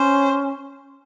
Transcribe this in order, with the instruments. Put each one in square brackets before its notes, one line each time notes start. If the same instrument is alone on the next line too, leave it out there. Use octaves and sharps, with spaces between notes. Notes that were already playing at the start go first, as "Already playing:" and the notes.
Already playing: [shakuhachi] C#4 [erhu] C5